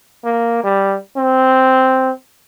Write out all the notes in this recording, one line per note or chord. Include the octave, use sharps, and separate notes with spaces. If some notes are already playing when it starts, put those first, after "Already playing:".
A#3
G3
C4